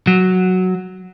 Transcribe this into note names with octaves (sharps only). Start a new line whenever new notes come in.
F#3